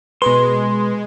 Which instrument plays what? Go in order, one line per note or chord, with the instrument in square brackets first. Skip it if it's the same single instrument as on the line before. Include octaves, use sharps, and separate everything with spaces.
[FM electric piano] B2 B4 [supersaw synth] G#3 [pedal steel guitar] C6